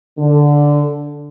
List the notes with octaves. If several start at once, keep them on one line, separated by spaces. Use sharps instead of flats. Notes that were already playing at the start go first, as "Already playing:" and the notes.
D3